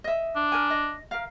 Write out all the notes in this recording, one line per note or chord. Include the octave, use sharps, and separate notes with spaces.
D#5 E5
D4
A#4 G#5
D#5
A#4 F5